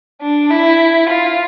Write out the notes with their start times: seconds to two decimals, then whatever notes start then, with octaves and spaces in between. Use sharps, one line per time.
0.21 D4
0.51 E4
1.10 F4